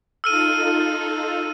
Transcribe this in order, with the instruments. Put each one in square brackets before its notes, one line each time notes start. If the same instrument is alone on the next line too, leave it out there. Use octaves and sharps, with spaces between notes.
[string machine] D#4 F4 A4 [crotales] E6 F6 D#7